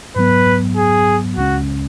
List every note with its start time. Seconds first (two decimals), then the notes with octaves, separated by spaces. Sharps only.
0.16 G#2 F#3 B3 B4
0.76 G#4
1.37 C#2 C#3 G#3 C#4 F#4